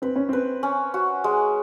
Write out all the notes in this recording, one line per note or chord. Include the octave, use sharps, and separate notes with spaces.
C4 B4
C#4
C4 B4
C#4
F#4
G#3